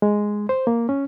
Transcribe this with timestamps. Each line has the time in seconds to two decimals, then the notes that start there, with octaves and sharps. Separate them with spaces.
0.02 G#3
0.49 C5
0.67 A#3
0.89 C#4